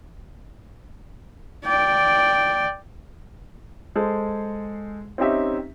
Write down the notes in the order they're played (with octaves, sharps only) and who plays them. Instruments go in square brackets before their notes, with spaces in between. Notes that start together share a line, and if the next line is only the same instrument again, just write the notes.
[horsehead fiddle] D5 G5
[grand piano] G#3 G#4 A4 C5
C4 C#4 D#4 G4 E5